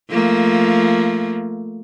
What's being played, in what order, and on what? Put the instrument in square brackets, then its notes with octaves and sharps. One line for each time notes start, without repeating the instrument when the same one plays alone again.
[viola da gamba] F3 A3 A#3